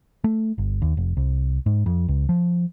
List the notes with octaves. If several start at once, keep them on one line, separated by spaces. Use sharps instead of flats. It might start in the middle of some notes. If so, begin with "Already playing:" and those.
A3
G1
D#2
F1
C2
G#2
F2
C#2
F3